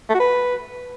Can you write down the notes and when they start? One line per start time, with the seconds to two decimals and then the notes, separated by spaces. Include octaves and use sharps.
0.09 A3
0.14 F#4
0.20 B4